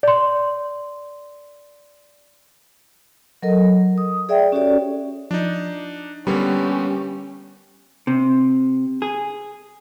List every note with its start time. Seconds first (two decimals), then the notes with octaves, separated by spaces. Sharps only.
0.03 D5 C6
3.42 F#3 A4 A#4 D#5
3.98 D#6
4.29 G#4 D5 E5 G5
4.52 C#4 F#4 G4 A4 C#5 D5
5.31 F3 D4 D#4
6.27 D3 G3 A#3 B3 C#4 G4
8.07 C3
9.02 G#4